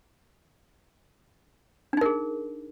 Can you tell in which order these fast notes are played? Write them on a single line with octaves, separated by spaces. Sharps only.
D4 D#4 A#4 G#4